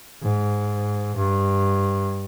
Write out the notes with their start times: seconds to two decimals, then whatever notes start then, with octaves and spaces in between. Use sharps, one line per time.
0.23 G#2
1.17 G2